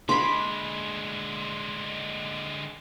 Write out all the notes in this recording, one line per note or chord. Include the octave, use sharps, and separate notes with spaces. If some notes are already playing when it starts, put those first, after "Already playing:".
D3 G#3 B5 C6 D6